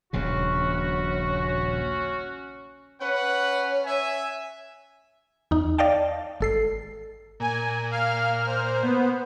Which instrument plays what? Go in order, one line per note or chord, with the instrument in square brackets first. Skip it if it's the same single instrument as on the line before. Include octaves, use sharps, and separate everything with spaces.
[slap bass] D#1 A#1 C#3 [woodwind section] C#4 F#4
[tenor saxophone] C#4 [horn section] B4 F#5
[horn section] E5 G#5
[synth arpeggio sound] E2 D#4
D5 D#5 F5 G5 A5
G#1 A4 C7
[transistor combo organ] A#2 [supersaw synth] G#5
[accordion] F5 [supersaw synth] F6
[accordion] C5
[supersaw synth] B3